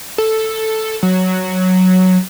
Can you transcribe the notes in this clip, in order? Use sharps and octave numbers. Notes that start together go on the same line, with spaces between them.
A4
F#3